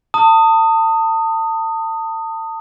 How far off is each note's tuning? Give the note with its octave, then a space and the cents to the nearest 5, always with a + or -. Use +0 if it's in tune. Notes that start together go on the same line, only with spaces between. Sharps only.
A5 +35 D#6 +0